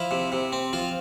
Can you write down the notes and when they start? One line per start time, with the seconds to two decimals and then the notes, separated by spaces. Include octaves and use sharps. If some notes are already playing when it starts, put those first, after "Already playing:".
Already playing: F3 E4
0.11 C3
0.32 C3
0.53 C4
0.73 F3 F4